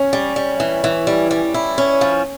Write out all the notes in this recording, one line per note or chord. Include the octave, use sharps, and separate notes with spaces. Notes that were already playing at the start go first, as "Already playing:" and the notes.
Already playing: C#4
G3
G3
E3
E3
G3
G3
E4
C#4
F3